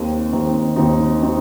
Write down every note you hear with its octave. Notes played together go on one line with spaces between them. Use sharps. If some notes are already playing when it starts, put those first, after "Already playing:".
Already playing: D#2 D#3 C4 D#4
D#2 D#3 C4 D#4
D#2 D#3 C4 D#4
D#3 C4 D#4